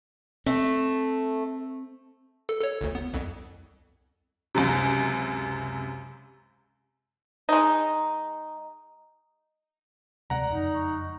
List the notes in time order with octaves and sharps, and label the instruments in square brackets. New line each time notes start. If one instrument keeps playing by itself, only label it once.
[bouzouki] A3 [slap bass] C4
[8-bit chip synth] A4
A4 C#5
G1 D2
B3
C2 F2
[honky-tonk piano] C#2 F#2 C3
[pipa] G#3 D#4
[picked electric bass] D2 C3 G#3 [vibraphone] D5 [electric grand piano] F#5 A#5
[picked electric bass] F#1 F2 G#3 [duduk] D#4
[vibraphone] C#6